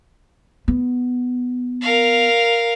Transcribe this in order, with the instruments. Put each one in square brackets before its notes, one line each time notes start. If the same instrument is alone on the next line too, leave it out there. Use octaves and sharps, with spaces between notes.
[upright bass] B3
[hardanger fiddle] A#4 F5